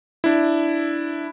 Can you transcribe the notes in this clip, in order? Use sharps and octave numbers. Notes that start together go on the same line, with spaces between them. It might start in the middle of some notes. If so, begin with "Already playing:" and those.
D4 E4